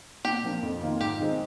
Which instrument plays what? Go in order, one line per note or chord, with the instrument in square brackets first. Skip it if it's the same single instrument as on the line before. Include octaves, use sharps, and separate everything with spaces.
[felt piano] A#2 [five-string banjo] G4
[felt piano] F3 A#3 D4
F2
D#3 A#3 F4
[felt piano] G#2 [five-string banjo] G4
[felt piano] D#3 G#3 C4